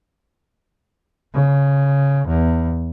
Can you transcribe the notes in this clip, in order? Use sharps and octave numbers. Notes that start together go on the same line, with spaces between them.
C#3
E2